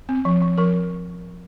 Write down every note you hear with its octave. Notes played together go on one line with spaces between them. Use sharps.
C4
F3
F3
F3 A#4